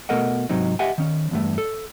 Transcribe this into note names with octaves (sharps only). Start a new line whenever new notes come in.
B2 A3 A4 A#4 D#5 F#5
G#2 C3 F#3 C4 D#4
G4 D#5 E5 F#5 G#5
D#3 C#4
E2 G2 A3
A4